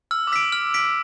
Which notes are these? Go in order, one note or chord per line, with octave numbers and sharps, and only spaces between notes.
E6 F6
D6
E6 B6 D7
F6
B6 D7